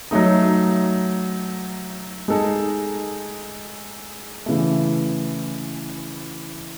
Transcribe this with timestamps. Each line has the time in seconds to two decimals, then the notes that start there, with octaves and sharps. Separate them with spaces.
0.11 F#3 A3 D#4
2.28 G#3 D#4 A4
4.46 C#3 E3 A3